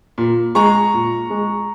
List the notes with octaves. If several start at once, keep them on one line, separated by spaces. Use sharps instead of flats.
A#2
G#3 A#5 C#6
A#2
G#3